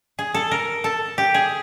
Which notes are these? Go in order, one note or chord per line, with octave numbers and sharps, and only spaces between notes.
G#4
A4
A#4
A4
G4
G#4